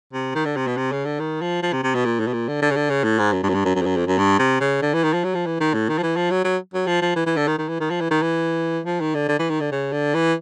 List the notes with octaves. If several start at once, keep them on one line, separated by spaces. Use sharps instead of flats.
C3
D#3
D3
C3
B2
C3
C#3
D3
D#3
F3
F3
C3
C3
B2
A#2
A2
B2
A#2
D3
D3
C#3
D3
C#3
A2
G#2
F#2
G2
F#2
G2
F#2
F#2
F2
F#2
F2
F#2
G2
C3
C#3
D3
E3
D#3
F3
F#3
F3
E3
D#3
A2
D#3
F3
E3
F3
F#3
F#3
F#3
F3
F3
E3
E3
D3
D#3
D#3
E3
D#3
F3
E3
D#3
E3
F3
D#3
D3
D3
E3
D#3
D3
C#3
D3
E3